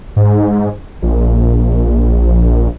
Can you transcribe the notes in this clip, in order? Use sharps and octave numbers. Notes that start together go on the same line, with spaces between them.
G#2
A#1